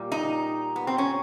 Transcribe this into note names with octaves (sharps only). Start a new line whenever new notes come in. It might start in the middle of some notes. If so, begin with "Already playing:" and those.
Already playing: A#2 G3
D#4
B3
C4
C#4